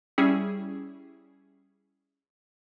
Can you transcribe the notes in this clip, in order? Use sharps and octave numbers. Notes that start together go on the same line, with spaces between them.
G3 C#4 E4 G#4